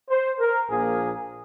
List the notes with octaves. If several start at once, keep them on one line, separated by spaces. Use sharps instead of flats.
C5
A#4
A#1 A#2 F3 A#3 G#4